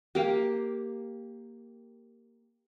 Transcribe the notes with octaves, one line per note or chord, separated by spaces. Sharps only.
A#3 G4